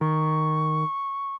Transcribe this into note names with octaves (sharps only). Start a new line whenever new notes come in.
D#3 C#6